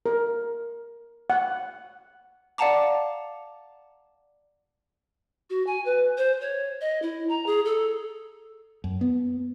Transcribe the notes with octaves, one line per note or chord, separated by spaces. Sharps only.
A#4
F#5
D5 F5 F#5 A5 A#5 D6
F#4
G#5
B4
C5
C#5
D#5
E4
A#5
G#4
A4
F#2
B3